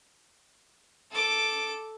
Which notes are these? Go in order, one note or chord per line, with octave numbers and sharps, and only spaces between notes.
A4 D6